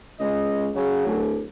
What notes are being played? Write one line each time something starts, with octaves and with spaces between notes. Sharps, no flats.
C#2 D#5
C#3 F#3
D1